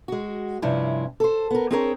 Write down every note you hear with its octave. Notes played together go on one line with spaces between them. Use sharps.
G#3 F#4
G2 C3 F3 C4 C#4 E4
A4 C5
B3 A#4
C4 D4 G#4 A#4 C5 C#5